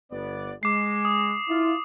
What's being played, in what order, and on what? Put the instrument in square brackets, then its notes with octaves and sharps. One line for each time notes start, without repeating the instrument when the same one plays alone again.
[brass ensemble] G1 B3 D5
[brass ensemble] G#3 [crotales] D6 C7
[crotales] D#6
[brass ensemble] E4 F4